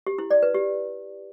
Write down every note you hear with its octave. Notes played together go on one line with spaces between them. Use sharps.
G4
E4
D5
B4
G4